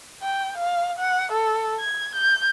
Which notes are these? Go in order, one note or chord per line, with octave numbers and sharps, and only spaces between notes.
G5
F5
F#5
A4
G#6
G6